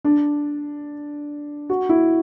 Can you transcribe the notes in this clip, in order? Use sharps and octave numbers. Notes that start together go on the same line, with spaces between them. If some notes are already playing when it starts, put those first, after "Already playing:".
D4
F#4
E4